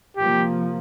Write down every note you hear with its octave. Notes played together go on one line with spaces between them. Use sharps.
C3 F3 A#3 G4